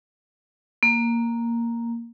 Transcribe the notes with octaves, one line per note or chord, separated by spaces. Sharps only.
A#3